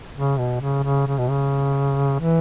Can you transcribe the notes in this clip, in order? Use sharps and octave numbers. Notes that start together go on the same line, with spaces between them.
C#3
B2
C#3
C#3
C#3
B2
C#3
E3